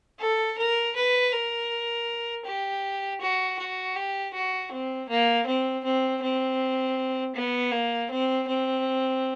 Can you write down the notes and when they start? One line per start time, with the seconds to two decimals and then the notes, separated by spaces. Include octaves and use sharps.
0.19 A4
0.57 A#4
0.95 B4
1.32 A#4
2.45 G4
3.21 F#4
3.59 F#4
3.95 G4
4.34 F#4
4.71 C4
5.09 A#3
5.46 C4
5.84 C4
6.22 C4
7.35 B3
7.72 A#3
8.10 C4
8.47 C4